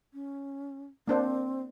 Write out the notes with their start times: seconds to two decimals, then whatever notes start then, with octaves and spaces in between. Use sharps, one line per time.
0.14 C#4
1.08 A#3 C4 D4 C5